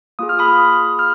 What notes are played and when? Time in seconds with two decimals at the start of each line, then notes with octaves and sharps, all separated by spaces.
0.19 A#3 F4 G#4 D#6
0.29 F6
0.39 B5 D#6
0.99 F6